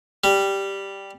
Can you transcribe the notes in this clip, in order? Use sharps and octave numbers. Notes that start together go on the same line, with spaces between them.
G3